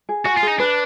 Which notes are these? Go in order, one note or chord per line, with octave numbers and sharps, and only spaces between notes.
G#4
F#4 G#5
F4
G#4
D#4
D4 B4